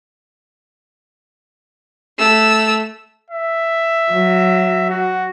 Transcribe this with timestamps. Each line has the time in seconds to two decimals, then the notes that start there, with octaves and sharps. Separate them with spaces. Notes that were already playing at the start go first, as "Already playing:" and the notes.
2.19 A3 E6
3.31 E5
4.12 F#3
4.90 F#4